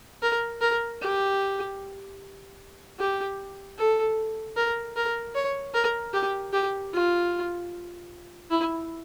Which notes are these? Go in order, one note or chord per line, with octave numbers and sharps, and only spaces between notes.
A#4
A#4
G4
G4
A4
A#4
A#4
C#5
A#4
G4
G4
F4
E4